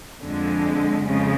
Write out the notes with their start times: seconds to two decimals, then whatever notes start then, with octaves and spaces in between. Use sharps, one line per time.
0.23 F2 D3 F3 G#3
1.05 F2 C#3 F3 G#3